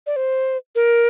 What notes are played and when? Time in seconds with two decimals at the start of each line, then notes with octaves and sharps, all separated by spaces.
0.07 D5
0.16 C5
0.75 A#4